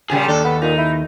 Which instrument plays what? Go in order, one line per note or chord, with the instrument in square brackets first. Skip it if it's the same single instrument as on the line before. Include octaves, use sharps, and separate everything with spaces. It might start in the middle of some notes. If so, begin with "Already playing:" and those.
[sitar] A#2 C#3 G3 [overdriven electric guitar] G#4
[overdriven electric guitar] D#2 [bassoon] D4 [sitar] A4
[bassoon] B3
[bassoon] A#2 [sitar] D#4
[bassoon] E4